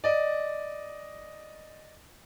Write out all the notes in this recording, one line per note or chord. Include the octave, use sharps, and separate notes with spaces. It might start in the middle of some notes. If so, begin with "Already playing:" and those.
D5 D#5